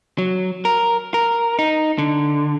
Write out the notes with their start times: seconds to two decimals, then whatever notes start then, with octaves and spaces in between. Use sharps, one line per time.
0.18 F#3
0.65 A#4
1.14 A#4
1.59 D#4
1.98 D3